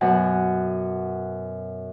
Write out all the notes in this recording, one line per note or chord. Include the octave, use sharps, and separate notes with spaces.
F#2 B2 F#5